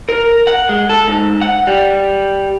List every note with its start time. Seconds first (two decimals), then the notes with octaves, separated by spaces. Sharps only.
0.09 A#4
0.47 F#5
0.69 G#3
0.89 A4
1.08 G#2
1.41 F#5
1.67 G3